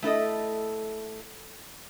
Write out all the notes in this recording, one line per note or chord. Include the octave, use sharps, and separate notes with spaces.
A3 E4 A4 D#5